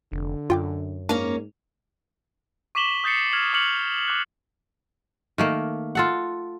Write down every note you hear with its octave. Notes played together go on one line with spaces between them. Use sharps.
F1 D3
F#2 F4 G5 D6
G#2 A#3 C#4 D4
C#6 D6 B6 E7 F#7 G7
D#6 G6 A6 C7 C#7
F6 G#6 F7 F#7
D6 D#6 F6 C#7 F7 F#7
D6 F#6
D#3 A3 A#3
F4 A4 F#5